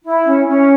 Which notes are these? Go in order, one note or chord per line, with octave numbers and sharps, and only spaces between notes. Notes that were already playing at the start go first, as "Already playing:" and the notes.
E4
C#4
C#4